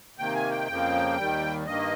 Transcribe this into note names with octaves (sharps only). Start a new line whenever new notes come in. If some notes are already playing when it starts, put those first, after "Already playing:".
C3 D#3 A#3 G5
G#5
G5
F2 C#3 F3 A#3
D#2 D#3 G3
G2 D#3 A#3 D#5